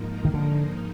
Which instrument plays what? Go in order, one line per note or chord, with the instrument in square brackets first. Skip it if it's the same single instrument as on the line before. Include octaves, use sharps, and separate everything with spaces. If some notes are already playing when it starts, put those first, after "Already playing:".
Already playing: [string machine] G#2 F3 A#3 D#4 A#4
[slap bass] D#3
D3